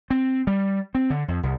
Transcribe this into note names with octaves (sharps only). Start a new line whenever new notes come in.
C4
G3
C4
D3
F2
C2